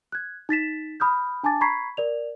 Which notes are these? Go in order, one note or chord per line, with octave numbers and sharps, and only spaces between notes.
F#6 G#6
D#4 A6 B6 E7
B5 D#6 F6 G6
D4 G#5 A5 D6 A6
A#5 B5 C#6 G#6 B6 C7
A#4 D5 F7